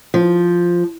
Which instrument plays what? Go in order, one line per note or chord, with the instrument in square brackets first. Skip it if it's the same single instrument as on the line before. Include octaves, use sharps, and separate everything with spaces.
[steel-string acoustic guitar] F3